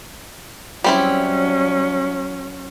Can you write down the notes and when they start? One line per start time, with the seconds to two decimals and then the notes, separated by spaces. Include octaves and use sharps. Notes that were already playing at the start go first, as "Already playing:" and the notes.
0.84 F#3 G3 C4 C#4 E4